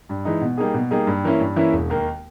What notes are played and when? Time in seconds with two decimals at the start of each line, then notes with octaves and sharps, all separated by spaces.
0.09 G2
0.25 E3 G#3 D#4
0.41 B2
0.57 G3 A#3 D#4 G#4
0.74 B2
0.91 G3 A#3 D#4 G#4
1.07 G2
1.24 E3 A#3 C#4 E4
1.40 G2
1.56 E3 A#3 C#4 E4
1.73 E1
1.90 D#2 D#3 A#3